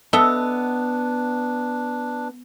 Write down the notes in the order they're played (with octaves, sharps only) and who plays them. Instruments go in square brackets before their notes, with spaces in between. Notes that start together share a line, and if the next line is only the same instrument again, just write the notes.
[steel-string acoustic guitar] B3 [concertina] D4 [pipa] A4 D#5 E5